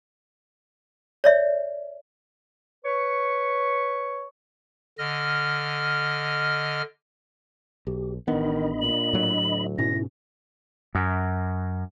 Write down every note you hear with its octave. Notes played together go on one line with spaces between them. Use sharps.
C#5 D5 E5
B4 C#5 C#6
D3 D#5 F6
B1 G4
A1 D#3 B3 D4 D#5 B5
A#2 F#7
A2 F#3
D2
G#2 B2 C#4 E4 A#6
F#2